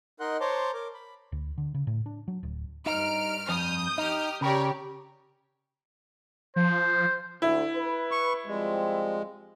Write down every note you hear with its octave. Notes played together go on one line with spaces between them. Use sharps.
D#4 A#4 D#5 F#5 C6 F#6
C5 C#5 A5 A#5 C6 D6
A#4 D6
B5
D2
D3
C#3
A2
D4
F#3
D1
G2 D#4 F6 D7
F2 D#6 G6
D#4 G4 F6
C#3 G4 A#4 C#5 D5
F3 C5
D2 E4
B4
C#6
F3 G3 G#3 C4